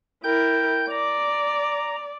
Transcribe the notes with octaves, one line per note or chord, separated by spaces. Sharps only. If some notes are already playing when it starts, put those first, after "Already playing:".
E4 A#4 G5 G6
D5 A#5